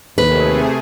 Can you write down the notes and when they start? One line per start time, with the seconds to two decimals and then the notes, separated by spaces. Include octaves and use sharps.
0.18 D#2 C3 A3 G#4 B4